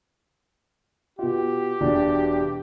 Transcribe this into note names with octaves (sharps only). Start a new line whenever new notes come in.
B2 F4 G4
E1 B2 D4